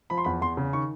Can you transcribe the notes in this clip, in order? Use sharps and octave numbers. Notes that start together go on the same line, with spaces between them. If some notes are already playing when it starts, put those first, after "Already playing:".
F3 B5
C6
E2 B5
E2 C6
C#3
D#3 C#6